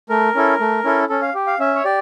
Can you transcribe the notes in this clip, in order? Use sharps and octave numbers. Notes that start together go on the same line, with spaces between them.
A3 A#4
C#4 E4 A4
A3
C#4 E4 A4
C#4 A4
F5
G4
F5
C#4 E5
C#5
G4 D5